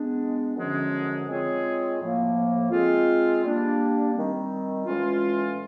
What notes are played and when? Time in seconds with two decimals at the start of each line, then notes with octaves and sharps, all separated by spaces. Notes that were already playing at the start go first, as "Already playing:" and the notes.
Already playing: G#3 B3 D4
0.56 F#2 D3 F3 G#3 C#4
1.27 G#3 C4 F4 G#4 C#5
2.00 A2 F3 A#3
2.71 G#3 C4 F4
3.43 G3 A#3 D4
4.14 D#3 G3 C4
4.85 A2 E3 G#3 C#4 F4